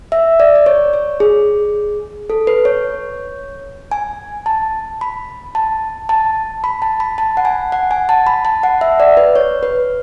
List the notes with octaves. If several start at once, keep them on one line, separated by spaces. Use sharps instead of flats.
E5
D5
D5
C#5
C#5
G#4
A4
B4
C#5
G#5
A5
B5
A5
A5
B5
A5
B5
A5
F#5
G#5
F#5
G#5
A5
B5
A5
F#5
E5
D5
B4
C#5
B4